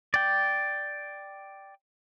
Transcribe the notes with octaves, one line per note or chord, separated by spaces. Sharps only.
D5 G5